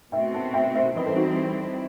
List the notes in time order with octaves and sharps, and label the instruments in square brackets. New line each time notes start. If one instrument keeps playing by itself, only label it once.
[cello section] B2 A3 C4 F#4 [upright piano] E5 G5
[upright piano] F#5 A5
E5 G5
C5 E5
[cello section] E3 G3 C4 E4 [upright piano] B4 D#5
[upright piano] A4 C5
D#4 F#4